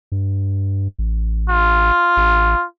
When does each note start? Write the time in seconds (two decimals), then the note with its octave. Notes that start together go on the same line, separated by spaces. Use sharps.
0.12 G2
0.99 A1
1.50 F4
2.17 A1